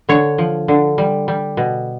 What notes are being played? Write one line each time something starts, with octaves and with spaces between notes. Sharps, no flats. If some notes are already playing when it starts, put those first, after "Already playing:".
D3 C#5
F3
D3
G3
G3
B2